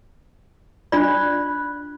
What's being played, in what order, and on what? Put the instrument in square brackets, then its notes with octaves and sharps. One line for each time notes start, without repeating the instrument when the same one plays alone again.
[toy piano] D4 F4 D5 [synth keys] B5 F#6